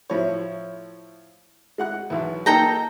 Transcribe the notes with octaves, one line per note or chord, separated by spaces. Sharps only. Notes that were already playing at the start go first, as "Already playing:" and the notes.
A2 F3 C#5
G#3 F#5 F#6
B1 E2
A#3 D#4 G#4 A4 G5 A#5